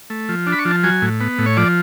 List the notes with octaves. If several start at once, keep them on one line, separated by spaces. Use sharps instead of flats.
A3
F3
D4
B5
C#6
F3
A5
F#3 G#5
A2
B3
A2
C#5
F3 D5